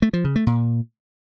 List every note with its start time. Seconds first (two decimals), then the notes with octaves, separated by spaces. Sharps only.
0.02 A3
0.13 F3
0.25 C#3
0.36 A3
0.47 A#2